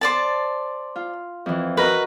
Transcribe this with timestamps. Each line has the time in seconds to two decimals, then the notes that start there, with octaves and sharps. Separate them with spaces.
0.01 C5 D5 A5
0.96 F4
1.46 F2 E3
1.77 F#4 A#4 B4 D#5